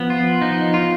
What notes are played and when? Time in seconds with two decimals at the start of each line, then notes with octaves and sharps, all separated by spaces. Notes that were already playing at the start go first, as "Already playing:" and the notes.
Already playing: F3 B3
0.10 F4
0.42 F3 D#4
0.74 F4